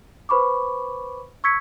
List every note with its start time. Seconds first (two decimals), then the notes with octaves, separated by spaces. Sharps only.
0.29 B4 C5 B5 C#6 D6
1.44 C#6 E6 G#6 B6 C#7